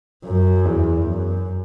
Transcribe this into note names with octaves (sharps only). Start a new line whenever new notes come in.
F#2
E2
F#2